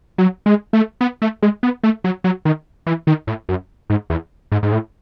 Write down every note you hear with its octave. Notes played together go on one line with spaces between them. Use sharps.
F#3
G#3
A3
B3
A3
G#3
B3
A3
F#3
F#3
D#3
E3
D#3
A2
F#2
G#2
E2
G#2
G#2
A2